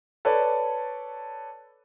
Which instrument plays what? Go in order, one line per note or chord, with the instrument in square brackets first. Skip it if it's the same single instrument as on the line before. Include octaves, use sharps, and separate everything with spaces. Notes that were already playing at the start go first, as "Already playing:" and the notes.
[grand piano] A4 B4 C#5 D5 A5